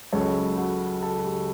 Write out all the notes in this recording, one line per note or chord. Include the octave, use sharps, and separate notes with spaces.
C#2 C#3 F#3 A4 C#5
F#4 A4
F#4 A4
G4